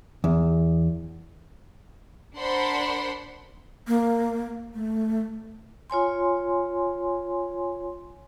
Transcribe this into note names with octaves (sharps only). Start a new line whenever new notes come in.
E2
D4 A#4 C5 F#5 B5 C6
A#3
A3
F4 C#5 G#5 C6